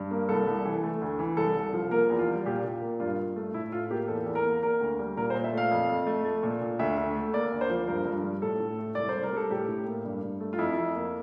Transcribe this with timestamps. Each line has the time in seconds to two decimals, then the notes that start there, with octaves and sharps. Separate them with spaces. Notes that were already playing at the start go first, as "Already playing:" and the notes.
Already playing: G2
0.11 A#3
0.29 C2 A4
0.47 C2
0.65 E3
0.83 A3
1.01 D2
1.19 E3
1.37 C2 A4
1.56 C2
1.73 F3
1.91 A#3 A#4
2.10 E2
2.19 F4
2.28 G3
2.46 A#2 G4
2.64 A#2
2.82 A#3
3.00 G2 F4
3.18 G2
3.36 A3
3.54 A2 E4
3.72 A2 F4
3.90 A#3 G4
4.08 E2 A4
4.26 E2
4.35 A#4
4.44 A#3
4.63 A#3 A#4
4.81 D2
4.99 G3
5.17 A#2 A#4
5.30 C5
5.35 A#2
5.44 E5
5.53 A3 F5
5.71 F2
5.89 F2
6.07 A3
6.25 A3
6.43 A#2
6.61 A#2
6.79 D2 E5
6.97 D2
7.15 A3
7.34 A#3 D5
7.52 D2
7.61 C5
7.70 F3
7.87 G2 A#4
8.05 G2
8.24 G3
8.42 A2 A4
8.60 A2
8.78 A3
8.95 C2 D5
9.09 C5
9.14 C2
9.23 A#4
9.33 G3 A4
9.51 A2 G4
9.68 A2
9.86 A#3
10.05 G2
10.23 G2
10.40 A3
10.53 F4
10.59 F2 E4
10.77 F2
10.95 A#3